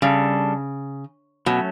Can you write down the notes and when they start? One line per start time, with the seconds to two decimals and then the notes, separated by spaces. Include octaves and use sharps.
0.02 C#3 G3 D4 A4
1.46 B2 F#3 A3 C#4